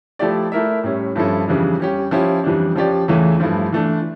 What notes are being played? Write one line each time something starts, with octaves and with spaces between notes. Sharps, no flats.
F3 A3 E4 G4 D5
A3 E4 A#4 E5
A2 G3 C#4
G2 F3 C#4 E4 A4
F2 C#3 E3 G3 D4
G3 C#4 G4
F3 C#4 E4 G4
F2 E3 G3 D4
F3 C#4 G4 D5
E2 C#3 E3 A3 C#4
G2 F3 A3 E4
E3 A3 D4